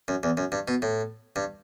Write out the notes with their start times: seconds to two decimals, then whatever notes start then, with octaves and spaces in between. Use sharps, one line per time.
0.08 F#2
0.23 E2
0.37 F#2
0.52 G2
0.68 B2
0.82 A2
1.36 G2